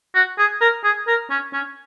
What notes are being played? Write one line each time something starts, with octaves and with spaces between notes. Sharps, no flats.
F#4
G#4
A#4
G#4
A#4
C#4
C#4